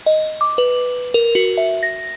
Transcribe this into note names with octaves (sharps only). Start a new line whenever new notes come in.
D#5
D6
B4
A#4
F#4
E5
A#6